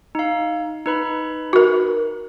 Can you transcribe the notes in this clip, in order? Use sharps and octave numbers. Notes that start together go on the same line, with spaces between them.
D#4 F5
D#4 B4 B5
F#4 A#4